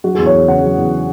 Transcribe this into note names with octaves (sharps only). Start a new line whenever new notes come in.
F#3 F#4
E2 G#4
C#5
E2
C#3 F#5
F#3
E2